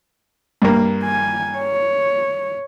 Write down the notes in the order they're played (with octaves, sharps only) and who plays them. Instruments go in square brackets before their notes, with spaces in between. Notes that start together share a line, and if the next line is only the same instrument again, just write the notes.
[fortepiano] G2 A#3
[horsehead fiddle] G#5
C#5